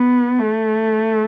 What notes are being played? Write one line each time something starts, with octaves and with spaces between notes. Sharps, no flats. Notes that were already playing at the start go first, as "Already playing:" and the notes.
Already playing: B3
A3